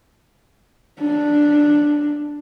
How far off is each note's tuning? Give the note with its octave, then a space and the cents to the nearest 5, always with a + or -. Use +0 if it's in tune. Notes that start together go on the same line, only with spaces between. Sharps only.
D4 +5